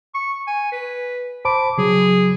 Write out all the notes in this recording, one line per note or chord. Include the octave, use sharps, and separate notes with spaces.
C#6
G#5
B4
C5 A5 B5 D6
C#3 F#3 G#4